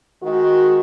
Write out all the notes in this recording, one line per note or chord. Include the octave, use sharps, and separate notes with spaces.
D#3 G#3 F#4